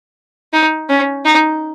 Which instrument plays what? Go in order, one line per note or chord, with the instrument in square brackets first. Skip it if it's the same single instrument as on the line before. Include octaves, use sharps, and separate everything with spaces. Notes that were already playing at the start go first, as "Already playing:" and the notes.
[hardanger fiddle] D#4
C#4
D#4